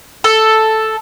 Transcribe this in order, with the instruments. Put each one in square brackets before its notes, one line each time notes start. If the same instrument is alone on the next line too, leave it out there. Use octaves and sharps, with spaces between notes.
[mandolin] A4